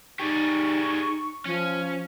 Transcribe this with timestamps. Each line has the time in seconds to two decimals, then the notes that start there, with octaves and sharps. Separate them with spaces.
0.20 D#4 G4 G#4 D5 C#6
1.45 F3 C#4